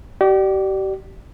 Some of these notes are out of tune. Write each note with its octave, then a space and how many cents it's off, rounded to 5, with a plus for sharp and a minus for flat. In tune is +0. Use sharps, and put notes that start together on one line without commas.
G4 -35 D5 +20